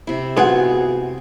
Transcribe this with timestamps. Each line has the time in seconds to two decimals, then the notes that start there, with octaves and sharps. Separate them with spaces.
0.07 C3 E4
0.37 G#2 B3 F4 F#4 G#4 F#5